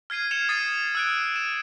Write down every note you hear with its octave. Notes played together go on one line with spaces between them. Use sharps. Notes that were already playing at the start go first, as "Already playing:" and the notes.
F6 G#6 C7 D#7
F6 G#6 C#7 E7 F7
D#6 A6 C7 C#7 D#7
E6 F#6 D7
D#7 E7